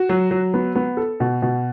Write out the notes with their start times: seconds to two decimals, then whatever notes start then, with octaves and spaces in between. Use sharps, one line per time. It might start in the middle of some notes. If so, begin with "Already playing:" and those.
Already playing: F#4
0.09 F#3
0.31 F#3
0.54 B3
0.75 B3
0.97 A4
1.20 B2
1.42 B2